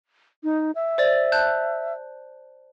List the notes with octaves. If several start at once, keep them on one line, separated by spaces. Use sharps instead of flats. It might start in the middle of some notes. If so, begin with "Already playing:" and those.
D#4
E5
C5 D5 A6
A5 F#6 G6